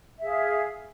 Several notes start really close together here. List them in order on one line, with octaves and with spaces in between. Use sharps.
E5 G#4 F5